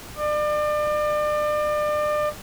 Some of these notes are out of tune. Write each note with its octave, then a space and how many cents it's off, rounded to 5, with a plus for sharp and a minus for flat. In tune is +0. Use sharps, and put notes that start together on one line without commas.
D5 +35